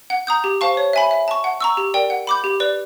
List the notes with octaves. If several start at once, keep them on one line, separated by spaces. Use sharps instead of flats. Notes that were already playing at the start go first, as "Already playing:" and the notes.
F#5
A#5 D#6 G6
G4
C5 F5 A5 C#6
C#5
E5 G#5 B5
E5
A5 C#6
F#5
A#5 C#6 E6
G4
A#4 D5 G5
F#5
B5 D6 G6
G4
B4 D5